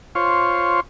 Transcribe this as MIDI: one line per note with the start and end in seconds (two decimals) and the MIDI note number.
0.15 0.80 65
0.15 0.80 72
0.15 0.80 73